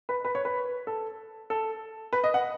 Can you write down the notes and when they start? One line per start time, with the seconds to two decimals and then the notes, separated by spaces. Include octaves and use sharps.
0.09 B4
0.25 B4
0.35 C#5
0.45 B4
0.87 A4
1.50 A4
2.13 B4
2.24 D#5
2.34 F#5